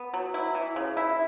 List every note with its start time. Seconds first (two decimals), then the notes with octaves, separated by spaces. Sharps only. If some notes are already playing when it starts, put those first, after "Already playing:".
Already playing: B3
0.14 F#3
0.34 E4
0.55 E3
0.76 C#3
0.97 E4